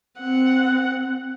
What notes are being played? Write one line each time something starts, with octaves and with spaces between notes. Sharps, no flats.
C4 F#5